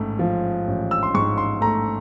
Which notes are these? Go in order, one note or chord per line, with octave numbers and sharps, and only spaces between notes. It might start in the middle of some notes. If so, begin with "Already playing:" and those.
Already playing: A1 G#2 A3
F3
A1
E6
C6
G#2 C#6
C6
A3 A#5